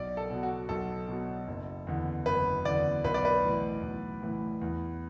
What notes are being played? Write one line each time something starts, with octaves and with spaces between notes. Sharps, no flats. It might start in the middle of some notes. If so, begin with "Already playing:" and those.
Already playing: B1 D5
A4
B2 F#3
F#4
B1 A4
B2 F#3
F#1
E2 D3
F#1 B4
E2 D3 D5
B1 B4
D5
B4
A2 E3
B1
A2 E3
E2